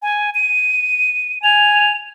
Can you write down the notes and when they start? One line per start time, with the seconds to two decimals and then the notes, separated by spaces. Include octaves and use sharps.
0.02 G#5
0.35 D#7
1.44 G#5 F7